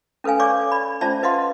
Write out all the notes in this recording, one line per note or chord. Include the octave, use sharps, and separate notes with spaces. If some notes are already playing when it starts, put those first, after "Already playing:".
C#4 A4 B4 F5 G#5
C#5 D5 F5 C#6 D6
D5 B5
C#4 F4 C5 D5 E5 A5
B4 D#5 F5 F#5 C6